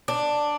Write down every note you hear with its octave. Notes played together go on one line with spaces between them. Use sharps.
D4